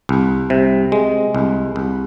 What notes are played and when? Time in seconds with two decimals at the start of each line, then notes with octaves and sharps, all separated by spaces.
0.09 C2
0.50 C3
0.92 G#3
1.35 C2
1.76 C2